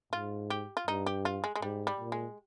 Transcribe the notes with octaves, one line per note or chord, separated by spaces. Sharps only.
G#2 F4
G4
F4
G2 D#4
G4
F4
G#3
G#3
G#2 G3
G3
A#2
G#3